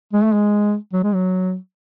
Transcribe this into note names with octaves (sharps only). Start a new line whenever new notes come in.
G#3
A3
G#3
F#3
G#3
F#3